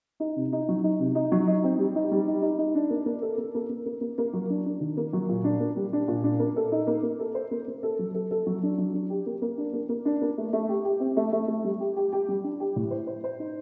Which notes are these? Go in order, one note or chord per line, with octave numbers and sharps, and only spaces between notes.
D#4
C3
D#4
F#3
D#4
C3
D#4
F#3
D#4
C4
G3
D#4
G3
D#4
D#4
D#4
D4
A#3
A#3
A4
A#3
A#3
A#3
A#3
A#3
A#3
F#3
D4
D4
D#3
A#3
F#3
A#2
D4
A#3
G3
D4
A#2
D4
A#3
A4
D#4
A#3
A#3
A4
C5
A#3
A#3
A4
F#3
A4
A4
F#3
D4
F#3
D4
G4
A#3
A#3
D4
A#3
A#3
D4
A#3
A3
A3
G4
G4
C4
A3
A3
A3
G3
G4
G4
G4
G3
D4
G4
A2
C5
C5
C5
D#4